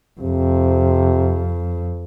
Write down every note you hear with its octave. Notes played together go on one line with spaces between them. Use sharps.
F2 C3